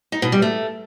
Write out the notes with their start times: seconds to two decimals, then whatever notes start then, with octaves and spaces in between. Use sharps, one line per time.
0.12 D#4
0.22 B2
0.32 G3
0.42 A3